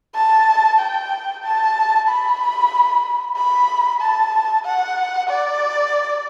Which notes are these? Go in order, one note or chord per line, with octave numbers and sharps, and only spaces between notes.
A5
G5
A5
B5
B5
A5
F#5
D5